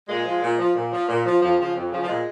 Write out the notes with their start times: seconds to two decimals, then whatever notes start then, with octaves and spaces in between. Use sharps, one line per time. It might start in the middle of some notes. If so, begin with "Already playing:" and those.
0.09 A#2 G#3
0.25 F3
0.42 A#2
0.59 F3
0.75 A#2
0.93 F3
1.08 A#2
1.26 F3
1.42 F2 F3
1.59 C#3 F3
1.76 F2
1.92 C#3 F3
2.02 F3
2.08 A#2 G#3